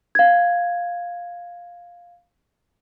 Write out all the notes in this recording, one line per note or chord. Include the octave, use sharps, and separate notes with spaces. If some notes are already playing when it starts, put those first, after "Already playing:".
F5 G#6